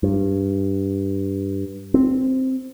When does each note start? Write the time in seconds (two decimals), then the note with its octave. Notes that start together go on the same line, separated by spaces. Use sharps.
0.03 G2
1.94 C4